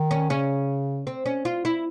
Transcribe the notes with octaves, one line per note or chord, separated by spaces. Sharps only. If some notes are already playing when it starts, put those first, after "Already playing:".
Already playing: D#3
C#4
C#3 C#4
C4
C#4
F4
E4